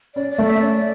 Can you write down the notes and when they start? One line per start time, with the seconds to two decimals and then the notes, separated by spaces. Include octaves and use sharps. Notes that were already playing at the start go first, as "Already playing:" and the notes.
0.15 C#4 D5
0.30 D5
0.38 A3
0.45 E5
0.60 C#4 D5